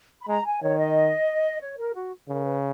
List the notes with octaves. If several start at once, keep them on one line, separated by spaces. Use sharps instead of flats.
B5
G#3 A#5
G#5
D#3 C#5
D#5
C#5
A#4
F#4
C#3 A#4
B4